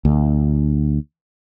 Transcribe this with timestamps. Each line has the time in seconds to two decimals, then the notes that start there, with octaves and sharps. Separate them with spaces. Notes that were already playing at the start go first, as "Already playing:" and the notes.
0.05 D2